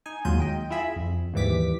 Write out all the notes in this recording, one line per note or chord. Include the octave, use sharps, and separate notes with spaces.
D#4 G#5
D#2 F#3 G#3 F4 G6 D#7
D#5 G5
E4 F4 G#4 E5 B5
F2
D#2 G#2 E3 G3 D6 B6